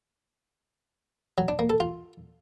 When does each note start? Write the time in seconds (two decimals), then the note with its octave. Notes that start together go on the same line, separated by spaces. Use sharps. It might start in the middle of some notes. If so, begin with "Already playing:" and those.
1.38 F#3
1.48 D4
1.59 A#3
1.70 A4
1.80 F4